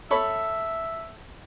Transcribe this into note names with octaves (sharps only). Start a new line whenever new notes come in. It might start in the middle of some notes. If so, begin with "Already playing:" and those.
A4 C#5 E5 B5